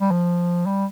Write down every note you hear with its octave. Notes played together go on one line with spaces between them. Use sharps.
G3
F3
G3